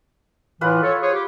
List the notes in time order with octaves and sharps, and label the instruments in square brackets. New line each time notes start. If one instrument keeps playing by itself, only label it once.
[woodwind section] A2 E3 [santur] F4 B4 F#5
[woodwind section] A4 C#5
G#4 C5 C#5
G4